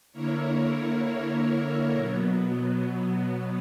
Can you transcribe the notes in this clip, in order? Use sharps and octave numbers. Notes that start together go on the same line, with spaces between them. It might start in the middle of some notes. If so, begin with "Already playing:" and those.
D3 A#3 E4 A#4 C#5
B2 F#3 B3